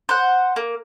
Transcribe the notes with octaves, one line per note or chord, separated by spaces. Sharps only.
C5 F#5
A#3